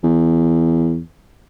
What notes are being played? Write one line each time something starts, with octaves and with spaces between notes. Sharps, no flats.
E2